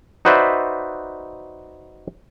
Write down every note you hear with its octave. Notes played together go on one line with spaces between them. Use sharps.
D#4 F#4 B4 C5 D5 E5